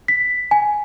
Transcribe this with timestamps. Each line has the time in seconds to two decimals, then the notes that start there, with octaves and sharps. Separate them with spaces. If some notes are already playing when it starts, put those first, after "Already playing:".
0.08 B6
0.51 G#5